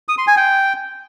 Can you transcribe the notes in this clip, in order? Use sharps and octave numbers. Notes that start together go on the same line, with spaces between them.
D#6
C6
G#5
G5